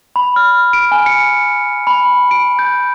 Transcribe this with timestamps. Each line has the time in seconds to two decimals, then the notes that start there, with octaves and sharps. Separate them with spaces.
0.16 B5
0.36 F6
0.73 D7
0.92 G#5
1.06 C#7
1.87 B5
2.31 D7
2.59 G6